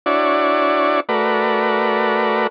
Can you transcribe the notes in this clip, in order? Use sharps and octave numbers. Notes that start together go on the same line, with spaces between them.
D4 E4 F#4 C#5 D5
A3 F#4 A#4 B4 D5